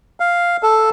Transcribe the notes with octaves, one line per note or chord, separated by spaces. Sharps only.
F5
A4